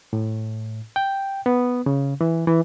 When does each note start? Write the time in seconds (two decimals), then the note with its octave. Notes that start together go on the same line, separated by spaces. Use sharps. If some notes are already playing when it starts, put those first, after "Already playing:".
0.13 A2
0.96 G5
1.46 B3
1.86 C#3
2.21 E3
2.48 E3